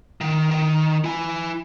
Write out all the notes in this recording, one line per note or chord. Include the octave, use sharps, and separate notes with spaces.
D#3
D#3
E4 G#5